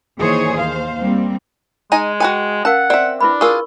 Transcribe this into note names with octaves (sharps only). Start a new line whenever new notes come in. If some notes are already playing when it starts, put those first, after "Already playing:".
D#3 E3 A#3 G#4 C5 C#5
D#2 C5 F5
G3 A#3 C4
G#3 D#4 D#5 G#5
F#4 B4 G5 G#5
C#4 A#4 F5 F#5 A5
C4 D5 E5
D4 E4 B4 B5
F4 G#4 A#4 C#6